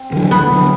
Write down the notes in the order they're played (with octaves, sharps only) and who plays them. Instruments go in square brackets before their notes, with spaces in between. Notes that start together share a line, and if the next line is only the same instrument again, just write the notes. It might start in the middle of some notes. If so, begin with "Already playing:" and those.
Already playing: [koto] C4
[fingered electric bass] D3 F#3
[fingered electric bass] D2 [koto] B3
[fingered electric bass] D3 F#3